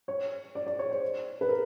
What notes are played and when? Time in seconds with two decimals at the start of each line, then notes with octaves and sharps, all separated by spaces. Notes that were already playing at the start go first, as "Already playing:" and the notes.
0.08 C#5
0.55 D5
0.67 D5
0.79 C#5
0.91 C5
1.41 B4
1.49 A#4